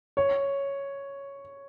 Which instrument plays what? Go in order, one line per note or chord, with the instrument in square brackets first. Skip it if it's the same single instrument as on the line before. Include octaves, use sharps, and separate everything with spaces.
[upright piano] C#5